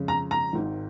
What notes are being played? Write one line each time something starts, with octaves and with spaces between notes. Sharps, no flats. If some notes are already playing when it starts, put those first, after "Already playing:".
Already playing: F2 C#3 G#3 C#4
A#5
A#5
G#1 G#2 D#3